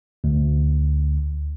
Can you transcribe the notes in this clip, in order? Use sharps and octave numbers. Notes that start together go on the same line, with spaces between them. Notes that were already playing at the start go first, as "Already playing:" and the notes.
D2